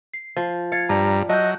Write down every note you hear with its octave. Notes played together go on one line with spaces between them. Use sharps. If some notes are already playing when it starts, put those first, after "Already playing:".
C7
F3
F5 G#6 A6 C#7
G2 D5 A5 A#5
F#3 D#5 E5 A5 F#6 G6